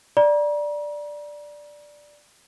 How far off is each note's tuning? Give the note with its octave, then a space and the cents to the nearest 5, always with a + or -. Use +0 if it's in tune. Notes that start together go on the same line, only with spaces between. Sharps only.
D5 +0 A#5 +35